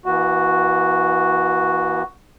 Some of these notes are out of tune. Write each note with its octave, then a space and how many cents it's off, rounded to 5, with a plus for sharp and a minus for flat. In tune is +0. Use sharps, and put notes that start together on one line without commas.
E3 +0 A#3 +40 F#4 +0